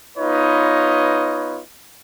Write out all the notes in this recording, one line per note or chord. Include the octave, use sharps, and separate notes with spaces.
B3 D#4 F4 B4 C#5 D#5